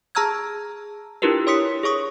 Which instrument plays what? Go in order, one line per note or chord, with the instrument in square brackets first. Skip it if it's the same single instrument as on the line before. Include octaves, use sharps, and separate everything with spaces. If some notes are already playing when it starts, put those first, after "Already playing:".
[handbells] G#4 A5 A#5 E6 F6 G#6
D4 E4 F4 G4 A#4 B4
C#5 C6 D#6 B6 C#7
G#4 C#5 C#6 D#6